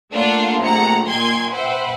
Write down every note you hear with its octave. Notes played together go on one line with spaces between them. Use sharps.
A3 A#3 D4 F4 F5 F#5
A#1 C3 A3 F#5 A#5 C#7
A#2 D#3 G5 G#5 C6 G#6
B4 C5 E5 F#5 G5